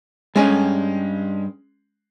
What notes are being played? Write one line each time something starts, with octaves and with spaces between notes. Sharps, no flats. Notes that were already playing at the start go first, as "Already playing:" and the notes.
G2 G#3 C#4 G#5